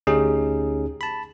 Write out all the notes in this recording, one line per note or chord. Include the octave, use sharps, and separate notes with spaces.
D2 C#4 D#4 G4 G#4 D#6
A5 B5